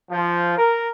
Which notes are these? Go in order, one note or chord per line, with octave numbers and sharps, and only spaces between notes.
F3
A#4